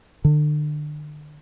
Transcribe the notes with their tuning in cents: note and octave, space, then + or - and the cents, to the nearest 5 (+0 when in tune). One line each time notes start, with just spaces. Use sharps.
D3 +35